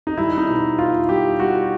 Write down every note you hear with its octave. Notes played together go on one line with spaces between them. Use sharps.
D#4
G3 E4
D#4
B2
B2 F4
G3 G4
G3 F#4